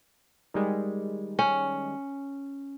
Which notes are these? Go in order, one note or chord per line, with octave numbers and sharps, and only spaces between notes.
D#3 G3 G#3
C#4